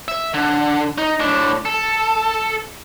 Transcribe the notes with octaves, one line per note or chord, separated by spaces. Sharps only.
E5
D3
D#4
A2 D4
A4